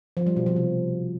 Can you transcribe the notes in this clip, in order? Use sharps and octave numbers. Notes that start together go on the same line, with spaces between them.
F3
G3
B2
F3
C3